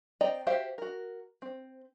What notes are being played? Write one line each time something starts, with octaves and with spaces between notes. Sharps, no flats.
C4 D5 D#5 G5 A#5
F#4 G4 C5 E5 F5
F#4 A#4
C4